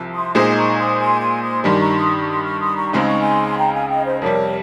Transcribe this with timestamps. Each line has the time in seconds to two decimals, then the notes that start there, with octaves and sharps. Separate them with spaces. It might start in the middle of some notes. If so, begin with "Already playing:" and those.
Already playing: C2 C3 F3
0.14 C6 D#6
0.35 A#2 G#3 D#4 G#4 C5 C6 D#6
0.56 A#5 C#6
0.78 C6 D#6
0.99 G#5 C6
1.20 G#5 C6
1.42 C6 D#6
1.63 G2 D#3 G3 G#5 C6
1.79 A#5 C#6
1.96 C6 D#6
2.19 C#6
2.28 C6 D#6
2.44 C#6 F6
2.60 C6 D#6
2.76 A#5 C#6
2.93 C#2 C#3 G#3 C4 D#4 C6
3.07 C#6
3.20 G#5 C6
3.57 G5 A#5
3.74 F5 G#5
3.89 D#5 G5
4.05 C5 D#5
4.21 F2 C3 G3 A#4 C#5